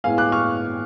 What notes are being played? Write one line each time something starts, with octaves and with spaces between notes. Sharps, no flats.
A2 G#3 B3 F5 G#5
D6 F#6
C#6 F6